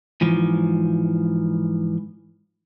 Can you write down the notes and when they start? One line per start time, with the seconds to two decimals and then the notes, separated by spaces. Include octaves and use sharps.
0.21 G#2 E3 F3